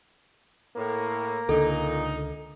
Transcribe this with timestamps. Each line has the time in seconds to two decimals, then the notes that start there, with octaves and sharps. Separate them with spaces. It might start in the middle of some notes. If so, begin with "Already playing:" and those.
0.77 A2 A#3
1.49 C#2 A#2 D3 D#4 A4